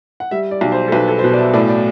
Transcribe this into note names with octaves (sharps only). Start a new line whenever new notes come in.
F#5
G3 E5
D5
B1
C5
A4
B1 B4
A4
C5
B2 B4
D5
E5
A2 D5
D5